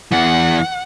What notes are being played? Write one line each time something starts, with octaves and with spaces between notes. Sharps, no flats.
E2 E3 F#5